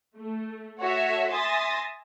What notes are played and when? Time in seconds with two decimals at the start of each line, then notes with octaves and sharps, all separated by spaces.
0.17 A3
0.79 F#4 A4 C#5 E5
1.30 E5 G#5 C6 D#6 A6 A#6